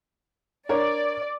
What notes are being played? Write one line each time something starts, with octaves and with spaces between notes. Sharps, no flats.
D4 A#4 C#5 D5